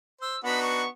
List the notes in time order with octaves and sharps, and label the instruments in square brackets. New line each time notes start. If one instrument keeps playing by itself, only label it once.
[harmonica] C5 [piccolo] E6
[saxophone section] B3 [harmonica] D4 D#4 F#4 [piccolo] B5
[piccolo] C#6